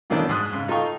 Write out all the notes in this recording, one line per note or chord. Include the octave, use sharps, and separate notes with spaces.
F2 B2 D#3 E3 C#4 D4
G#2 D#6 F#6
G#2 C#3
D#4 F4 A4 G5 C#6